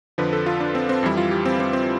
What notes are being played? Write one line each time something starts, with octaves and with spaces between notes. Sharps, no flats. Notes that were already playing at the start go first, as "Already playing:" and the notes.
F2 D3 F3 B4
A4
F4
D4
C4
C4
F2 E3 G3 E4
F4
G4
C4
C4
C4